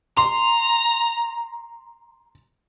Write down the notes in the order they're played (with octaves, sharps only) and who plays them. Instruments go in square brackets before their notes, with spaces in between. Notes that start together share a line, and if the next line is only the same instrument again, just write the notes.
[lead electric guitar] A#5 [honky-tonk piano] C6